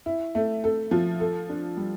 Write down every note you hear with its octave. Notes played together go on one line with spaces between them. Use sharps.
E4
A3
A4
F3
A4
D4
G3